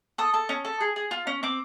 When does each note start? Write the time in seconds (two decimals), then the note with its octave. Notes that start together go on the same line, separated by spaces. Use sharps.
0.18 A4 D#6
0.34 A4
0.49 C#4
0.65 A4
0.81 G#4
0.96 G#4
1.11 F4
1.27 C#4
1.43 C4 D6